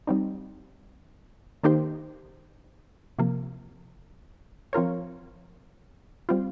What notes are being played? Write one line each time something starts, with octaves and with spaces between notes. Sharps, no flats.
G3 C4 D#4
D#3 A#3 D#4 G4 C5
C3 F3 A#3
F3 C4 F4 A#4 C#5
G3 C4 F4